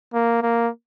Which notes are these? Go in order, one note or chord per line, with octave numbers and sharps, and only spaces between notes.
A#3
A#3